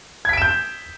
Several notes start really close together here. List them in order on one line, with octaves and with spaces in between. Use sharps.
G#6 B6 D7 E7 G6